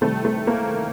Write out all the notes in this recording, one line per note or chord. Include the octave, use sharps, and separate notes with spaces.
C3 D#3 G3 A3
A3
A#3